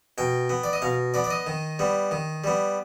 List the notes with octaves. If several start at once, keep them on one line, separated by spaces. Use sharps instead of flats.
B2 G5
B3
D5
D#5
B2 F5
B3 D5
D5
D#5
D#3
G3 B3
D#3
G3 B3